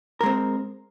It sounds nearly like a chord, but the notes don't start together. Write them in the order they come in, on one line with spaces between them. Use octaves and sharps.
A#4 G#3 C4